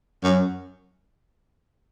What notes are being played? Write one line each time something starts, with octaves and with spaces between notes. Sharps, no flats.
F#2